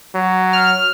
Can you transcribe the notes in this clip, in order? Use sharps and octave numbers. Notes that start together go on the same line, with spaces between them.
F#3
F6